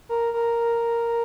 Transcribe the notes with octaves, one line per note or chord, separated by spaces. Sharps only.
A#4
A#4